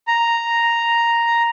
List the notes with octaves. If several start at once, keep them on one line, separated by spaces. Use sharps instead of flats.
A#5